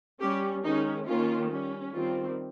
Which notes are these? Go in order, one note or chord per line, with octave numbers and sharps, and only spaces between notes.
G3 C#4 G4
D#3 G#3 C#4 D#4
D#3 A#3 C#4 F4
G3 C#4
D#3 G3 C4 F4